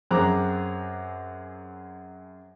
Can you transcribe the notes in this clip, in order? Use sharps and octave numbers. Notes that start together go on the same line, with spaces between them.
F#2 C4 G#4 A#5 D6 F#6